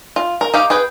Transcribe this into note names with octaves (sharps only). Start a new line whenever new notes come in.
F4
A#4
D#4 G4 F5
G#4 B4 G5